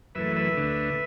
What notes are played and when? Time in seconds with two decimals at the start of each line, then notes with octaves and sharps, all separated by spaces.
0.15 F#2 E3 A3 B4 E5
0.36 B4 E5
0.57 D2 D3 A3